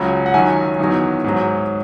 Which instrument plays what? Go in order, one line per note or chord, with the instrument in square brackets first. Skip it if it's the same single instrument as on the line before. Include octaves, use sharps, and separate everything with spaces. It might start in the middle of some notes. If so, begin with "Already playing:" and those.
Already playing: [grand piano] C#2 C#3 F#3 A5
F#5
F#2 D#3 F#3 E5 G#5
E2 D#3 F#3
G#2 F#3